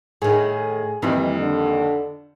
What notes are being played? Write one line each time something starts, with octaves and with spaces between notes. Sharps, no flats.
A2 D#3 G#4
F2 D#3 E3 G3 A#3
D3